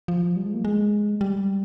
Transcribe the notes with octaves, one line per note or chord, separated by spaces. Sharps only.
F3
G3
G#3
A#3
G#3
G3